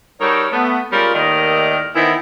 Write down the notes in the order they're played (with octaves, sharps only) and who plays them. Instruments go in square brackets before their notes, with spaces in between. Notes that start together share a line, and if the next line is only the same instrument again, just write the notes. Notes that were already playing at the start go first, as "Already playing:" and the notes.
[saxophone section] G3 D#4 F#4 A4 A#4 C#5
A3 B3
G3 G#3 C#4 F4 A#4
D#2 A2 D#3 A#4 D5 D#5
D#3 E3 B3 C4 E4